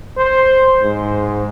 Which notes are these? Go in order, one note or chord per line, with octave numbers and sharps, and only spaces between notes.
C5
G#2